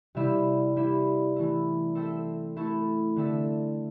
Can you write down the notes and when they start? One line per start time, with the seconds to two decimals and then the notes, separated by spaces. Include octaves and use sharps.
0.15 C3 G3 E4 C5 E5
0.76 G3 E4 C5 E5
1.36 E3 A3 E4
1.95 C4 A4 C5 E5
2.56 A3 E4 A4
3.16 D3 C4 A4 E5